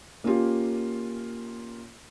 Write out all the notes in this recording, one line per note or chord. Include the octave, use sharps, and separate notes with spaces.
A#3 C#4 F4 G4